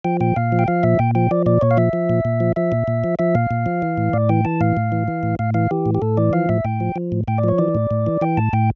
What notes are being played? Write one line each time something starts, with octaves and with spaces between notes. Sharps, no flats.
F3 G5
A#2 G5
A#2 F5
F3
G5
F3 F5
A#2 E5
A#2 G5
F3 G5
F3 D5
A#2 D5
A#2 C#5
F5
F3 E5
F3
A#2
A#2
F3
F3 E5
A#2
A#2
F3
F3 E5
A#2 F5
A#2
F3
E3
A2
A2 D5
E3 G5
E3 A5
A2 F5
A2
E3
E3
A2
A2 F5
E3 F5
E3 G4
A2
G4
A2 A4
E3 D5
F3 F5
A2 E5
A2 G5
F3
F3
A2
A2 G5
D5
F3 C#5
E3 D5
A2
A2
E3
E3 G5
A2 A5
A2 G5